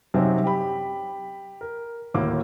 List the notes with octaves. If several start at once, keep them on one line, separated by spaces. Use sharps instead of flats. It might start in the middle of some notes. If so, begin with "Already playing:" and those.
F#2 C3 F#3 C4 D#4 F#4
G4 B5
A#4
D1 D#2 A2 A#3 D6